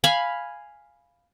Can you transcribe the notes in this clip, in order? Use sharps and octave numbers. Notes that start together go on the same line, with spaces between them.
F5 G#5 B5